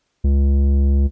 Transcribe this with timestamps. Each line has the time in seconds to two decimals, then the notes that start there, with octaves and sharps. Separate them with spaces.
0.24 C#2